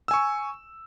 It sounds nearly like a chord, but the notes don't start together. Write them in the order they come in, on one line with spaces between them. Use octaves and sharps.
E6 G#5 C#6